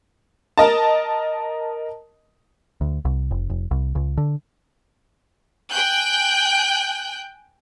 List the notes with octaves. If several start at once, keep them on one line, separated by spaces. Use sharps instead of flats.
A#4 D#5 A5
D2
C2
F1
F1
C2
C#2
D3
G5 G#5 F#6 G6